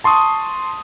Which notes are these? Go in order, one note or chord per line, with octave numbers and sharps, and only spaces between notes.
A5 C6 C#6 D#6